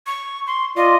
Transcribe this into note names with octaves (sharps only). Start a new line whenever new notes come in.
C#6
C6
F4 D5 D#5